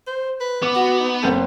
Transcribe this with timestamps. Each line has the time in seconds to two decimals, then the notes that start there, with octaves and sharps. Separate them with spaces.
0.07 C5
0.40 B4
0.63 B3 D6
0.76 F#4
1.00 D#4
1.23 F#1 C4 A4 G6